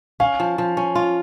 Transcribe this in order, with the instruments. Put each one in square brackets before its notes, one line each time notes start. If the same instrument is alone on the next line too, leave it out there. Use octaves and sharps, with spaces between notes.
[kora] C#4 [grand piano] F5
[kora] F3
F3
C#4
F4